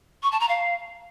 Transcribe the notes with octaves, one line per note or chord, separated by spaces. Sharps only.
C#6
A5
A#5
F5